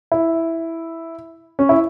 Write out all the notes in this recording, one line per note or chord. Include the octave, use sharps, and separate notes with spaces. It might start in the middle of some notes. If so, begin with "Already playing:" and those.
E4
C#4
E4